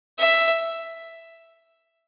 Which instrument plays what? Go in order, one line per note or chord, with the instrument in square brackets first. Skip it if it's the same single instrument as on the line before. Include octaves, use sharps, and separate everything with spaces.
[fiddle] E5